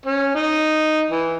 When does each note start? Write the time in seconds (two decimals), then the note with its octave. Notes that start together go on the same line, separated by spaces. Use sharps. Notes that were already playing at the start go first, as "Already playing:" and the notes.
0.06 C#4
0.35 D#4
1.11 E3